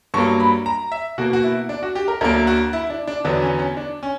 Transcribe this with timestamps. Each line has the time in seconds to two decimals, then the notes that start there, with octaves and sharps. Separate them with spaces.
0.14 G2 F#3 A#3 C#6
0.40 B5
0.66 A#5
0.92 E5
1.18 B2 A#3 F#4
1.33 F#4
1.43 E4
1.69 D4
1.83 F#4
1.95 G4
2.08 A#4
2.21 D2 D3 F#3 A#3 A#4
2.47 F#4
2.73 E4
2.90 D4
3.07 D4
3.24 E2 D3 F#3 B3 D4
3.42 C#4
3.59 C#4
3.77 D4
4.03 C#4